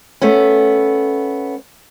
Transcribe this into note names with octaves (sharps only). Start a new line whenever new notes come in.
A3 B3 C#4